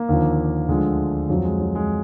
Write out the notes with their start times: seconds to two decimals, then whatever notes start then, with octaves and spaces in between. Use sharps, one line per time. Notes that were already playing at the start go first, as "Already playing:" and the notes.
Already playing: A#3
0.09 D#2 D3 F3
0.69 D2 D3 F3 G#3
1.29 F2 F3 F#3
1.45 G#3
1.60 F#3
1.75 G#3